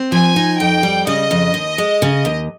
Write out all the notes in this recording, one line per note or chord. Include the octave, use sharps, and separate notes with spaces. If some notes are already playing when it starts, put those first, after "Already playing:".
Already playing: C4
F3 G#5
D#4
F2 G5
G3
C#3 D#5
F2
D#2
G#3
C#3
D#2